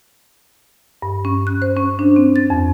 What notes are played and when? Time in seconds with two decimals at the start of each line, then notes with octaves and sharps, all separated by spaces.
1.02 G2
1.25 C#4
1.47 F#6
1.62 C5
1.77 C#4
1.99 D4
2.16 C4
2.36 A6
2.50 F2